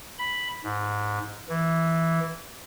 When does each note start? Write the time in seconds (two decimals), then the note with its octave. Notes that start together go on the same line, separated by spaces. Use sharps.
0.19 B5
0.64 G#2
1.49 E3